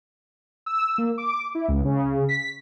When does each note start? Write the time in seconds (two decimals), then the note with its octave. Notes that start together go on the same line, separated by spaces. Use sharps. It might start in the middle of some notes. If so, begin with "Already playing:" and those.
0.66 E6
0.98 A#3
1.18 D6
1.55 E4
1.68 C#2
1.85 C#3
2.29 B6